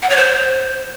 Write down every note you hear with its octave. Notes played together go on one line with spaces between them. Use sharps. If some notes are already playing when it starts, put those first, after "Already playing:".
F#5
C#5
C5